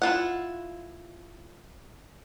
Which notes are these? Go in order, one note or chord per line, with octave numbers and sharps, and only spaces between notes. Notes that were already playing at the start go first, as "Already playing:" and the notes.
E4 F4 F#5